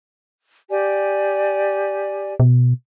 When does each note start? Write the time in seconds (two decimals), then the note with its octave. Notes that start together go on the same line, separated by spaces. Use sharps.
0.71 G4 D5 G#5
2.40 B2